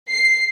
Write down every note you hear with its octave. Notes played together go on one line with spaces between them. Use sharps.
C7